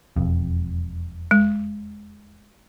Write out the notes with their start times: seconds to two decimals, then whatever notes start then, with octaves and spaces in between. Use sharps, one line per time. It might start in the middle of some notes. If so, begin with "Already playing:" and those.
0.16 E1 F2
1.31 G#3